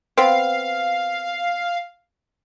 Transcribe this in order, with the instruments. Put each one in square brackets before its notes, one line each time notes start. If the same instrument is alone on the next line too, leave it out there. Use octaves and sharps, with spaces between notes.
[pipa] B3 C4 [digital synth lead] F5